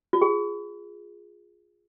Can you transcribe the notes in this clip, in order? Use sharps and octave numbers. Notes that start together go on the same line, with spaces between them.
F4
G#4